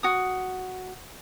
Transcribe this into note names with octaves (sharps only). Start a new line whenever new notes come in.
F#4 D#6